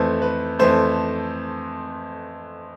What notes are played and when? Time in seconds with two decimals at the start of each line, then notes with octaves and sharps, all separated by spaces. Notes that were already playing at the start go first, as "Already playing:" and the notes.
Already playing: F2 E3 A3 C5
0.22 B4
0.59 F2 E3 A3 C5